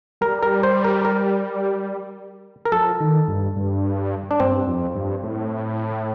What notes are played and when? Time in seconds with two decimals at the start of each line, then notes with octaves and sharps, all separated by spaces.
0.21 G3 A#4
0.43 A#4
0.63 C5
0.85 A#4
1.05 A#4
2.65 A#4
2.72 F3 A4
3.00 D#3
3.28 G2
3.56 G2
4.31 D4
4.40 G2 C4
4.67 F2
4.96 G2
5.23 A2